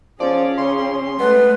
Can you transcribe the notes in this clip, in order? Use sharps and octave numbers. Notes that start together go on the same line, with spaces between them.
F3 C#4 G#4 D5
C#3 C6
G#3 A3 B3 B4